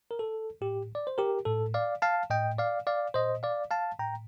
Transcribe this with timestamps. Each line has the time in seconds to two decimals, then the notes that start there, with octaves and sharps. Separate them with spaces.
0.11 A#4
0.19 A4
0.61 A2 G4
0.95 D5
1.07 C5
1.18 G4 A#4
1.45 A2 A4
1.74 D5 F5
2.02 F5 A5
2.30 A2 D#5 G5
2.58 D5 F5
2.87 D5 F5
3.14 A#2 C5 D#5
3.43 D5 F5
3.71 F5 A5
3.99 A2 G5 A#5